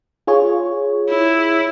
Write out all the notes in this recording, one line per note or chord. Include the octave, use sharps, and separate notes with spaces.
F4 G#4 C#5
E4